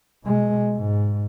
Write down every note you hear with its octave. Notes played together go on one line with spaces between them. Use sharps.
B2 G#3
G#2